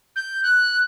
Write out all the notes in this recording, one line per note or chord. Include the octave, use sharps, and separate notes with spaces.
G6
F#6